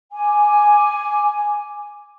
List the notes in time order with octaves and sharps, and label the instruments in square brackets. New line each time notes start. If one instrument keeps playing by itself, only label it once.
[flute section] G#5 D6